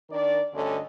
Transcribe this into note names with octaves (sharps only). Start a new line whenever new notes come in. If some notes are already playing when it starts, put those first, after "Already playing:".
D#3 D4 A#4 D5
D2 G2 D3 C#4 A4 D#5